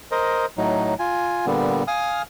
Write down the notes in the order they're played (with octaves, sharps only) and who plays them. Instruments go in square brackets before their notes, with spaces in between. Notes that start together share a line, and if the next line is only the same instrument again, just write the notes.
[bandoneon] A#4 C5 D#5
A2 F#3 D#4
F4 G#5
A#2 D3 G3 B3
F5 G#5 D#6 F6